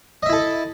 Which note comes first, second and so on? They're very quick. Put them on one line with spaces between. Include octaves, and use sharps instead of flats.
D#5 E5 E4 A4